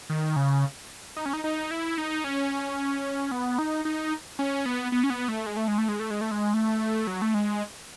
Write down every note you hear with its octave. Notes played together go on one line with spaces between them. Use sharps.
D#3
C#3
D#4
C#4
D#4
D#4
E4
D#4
C#4
B3
D#4
D#4
C#4
B3
B3
C#4
B3
A3
G#3
A3
G#3
A3
G#3
A3
G#3
A3
G#3
A3
F#3
A3
G#3